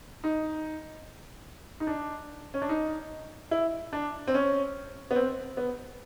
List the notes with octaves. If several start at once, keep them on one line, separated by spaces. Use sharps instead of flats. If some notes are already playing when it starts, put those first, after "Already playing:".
D#4
D#4
D4
C#4
D4
D#4
E4
D4
C4
C#4
B3
C4
B3